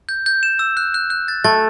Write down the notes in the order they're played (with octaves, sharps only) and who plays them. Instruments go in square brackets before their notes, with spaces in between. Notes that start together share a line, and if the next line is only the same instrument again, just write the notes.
[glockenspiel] G6
G6
E7
E6
F#6
F#6
F#6
A6
[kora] A3 [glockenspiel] A6